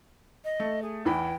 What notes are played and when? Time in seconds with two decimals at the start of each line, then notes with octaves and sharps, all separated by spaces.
0.44 D#5
0.60 A3
0.82 G#4
1.05 E2 E3 G5 B5